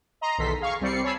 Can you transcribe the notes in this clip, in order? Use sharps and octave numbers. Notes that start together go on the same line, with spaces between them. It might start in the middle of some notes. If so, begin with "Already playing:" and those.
D#5 A#5 C6
B1 E2 D#3 A4 C6 B6
G#4 F5 C#6
C2 G3 C4 D5 C7 C#7
C#5 G#5 A5 B5 E6 C7